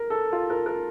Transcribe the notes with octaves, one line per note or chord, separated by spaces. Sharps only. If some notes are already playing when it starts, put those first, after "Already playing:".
Already playing: A#4
A4
F4
A#4
A#4